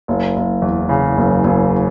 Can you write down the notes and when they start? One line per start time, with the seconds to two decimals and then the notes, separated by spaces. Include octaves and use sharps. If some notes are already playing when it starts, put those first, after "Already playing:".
0.08 F#1
0.36 F#1
0.62 E2
0.89 C#3
1.17 F#1
1.44 F#1